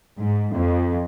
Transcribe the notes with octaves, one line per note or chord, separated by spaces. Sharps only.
G#2
F2